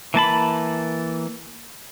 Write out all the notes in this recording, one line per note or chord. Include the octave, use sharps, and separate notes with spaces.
E3 A#3 A5 B5